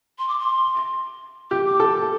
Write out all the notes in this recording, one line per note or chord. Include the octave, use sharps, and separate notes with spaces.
C6
D6
C6
G4 D6
D6
A4